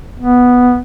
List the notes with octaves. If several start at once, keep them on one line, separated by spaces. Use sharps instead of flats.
B3